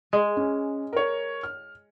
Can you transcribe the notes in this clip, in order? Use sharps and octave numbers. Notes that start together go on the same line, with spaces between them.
G#3
C#4
A#4 C#5
F6